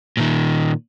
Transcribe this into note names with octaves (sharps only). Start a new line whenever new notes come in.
A#2 D#3